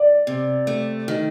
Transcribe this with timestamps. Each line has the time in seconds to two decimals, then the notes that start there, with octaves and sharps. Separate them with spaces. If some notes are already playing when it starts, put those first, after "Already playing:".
Already playing: D5
0.27 C3
0.67 A3
1.08 D#3